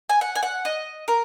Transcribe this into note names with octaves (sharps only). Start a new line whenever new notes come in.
G#5
F#5
G#5
F#5
D#5
A#4